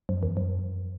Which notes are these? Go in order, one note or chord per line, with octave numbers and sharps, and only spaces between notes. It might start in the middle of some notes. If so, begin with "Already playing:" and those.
F#2
E2
F#2